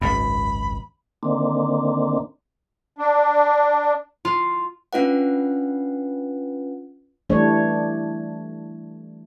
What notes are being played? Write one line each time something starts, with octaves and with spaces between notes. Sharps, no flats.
G#1 C#2 F#2 B5
D3 D#3 A#3 C4 D4
D4
F4
C#4 D4 F4 B4 F#5
E3 G3 A3 D4 C#5